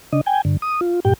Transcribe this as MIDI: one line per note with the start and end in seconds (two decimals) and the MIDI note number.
0.13 0.21 49
0.13 0.21 62
0.13 0.21 75
0.26 0.42 79
0.26 0.42 80
0.45 0.57 43
0.45 0.57 50
0.62 0.81 87
0.81 1.00 65
1.05 1.13 43
1.05 1.13 46
1.05 1.13 67
1.05 1.13 79